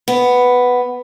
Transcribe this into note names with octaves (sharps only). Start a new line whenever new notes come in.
B3